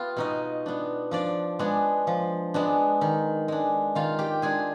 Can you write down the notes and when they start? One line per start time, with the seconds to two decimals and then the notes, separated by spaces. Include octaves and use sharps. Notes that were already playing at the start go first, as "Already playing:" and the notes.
Already playing: B3 F4 G4
0.17 B2 D#4 D#5
0.66 B3 D4
1.11 F3 D4 D5
1.59 G#3 B3 D4
2.07 F3
2.54 G#3 B3 D4
3.01 D#3
3.48 G#3 D4
3.95 D#3 F4 F5
4.19 G4 G5
4.42 G#3 D4 G#4 G#5